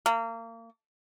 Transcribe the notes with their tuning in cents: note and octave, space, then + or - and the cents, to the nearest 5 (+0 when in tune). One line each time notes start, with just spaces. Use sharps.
A#3 -30